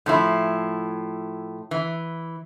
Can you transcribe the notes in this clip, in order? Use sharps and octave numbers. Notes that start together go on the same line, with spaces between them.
A2 F3 E4
E3